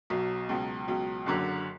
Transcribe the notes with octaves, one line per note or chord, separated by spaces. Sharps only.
B1 B2 F#3
C#2 B2 F#3
C#2 B2 F#3
F#1 F#2 D3 F#3